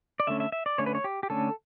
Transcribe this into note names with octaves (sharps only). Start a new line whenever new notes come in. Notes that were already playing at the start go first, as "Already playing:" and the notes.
D5
D3 A3 C#4 E5
E5
E5
D5
D3 A3 C#4 C#5
B4
C#5
G4
G4
D3 A3 C#4 A4